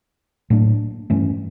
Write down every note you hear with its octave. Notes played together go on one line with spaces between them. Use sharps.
A2 F#3 A#3 D4
G2 E3 A3 C#4